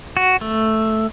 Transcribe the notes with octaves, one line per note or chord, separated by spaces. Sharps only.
F#4
A3